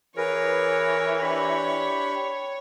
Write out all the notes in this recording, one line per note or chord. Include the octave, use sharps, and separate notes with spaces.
E3 G#4 A#4 B4 C#5
D4 G4 B5